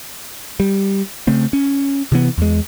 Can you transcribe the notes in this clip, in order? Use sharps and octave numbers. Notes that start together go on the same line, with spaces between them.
G3
C#3 A3 C4
C#4
C3 E3 B3
E2 G#3